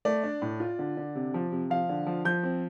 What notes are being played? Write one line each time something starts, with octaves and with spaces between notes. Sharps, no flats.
A3 D5
D4
A2
F4
D3
D3
C3
F3
C3
F3 F5
D3
F3
F3 G6
C4